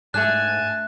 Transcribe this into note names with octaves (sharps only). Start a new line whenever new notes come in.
G#2 A3 D4 G#5 A5 F#6